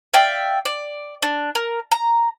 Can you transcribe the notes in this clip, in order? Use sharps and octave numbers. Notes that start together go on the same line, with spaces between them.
D5 E5 F5 G5
D5
D4
A#4
A#5